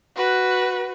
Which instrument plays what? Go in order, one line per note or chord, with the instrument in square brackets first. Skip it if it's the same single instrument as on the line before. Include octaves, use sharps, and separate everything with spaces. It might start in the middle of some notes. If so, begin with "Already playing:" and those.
[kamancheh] F#4 B4